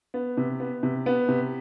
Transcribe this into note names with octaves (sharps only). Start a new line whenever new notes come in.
B3
C3
B3
C3
B3
C3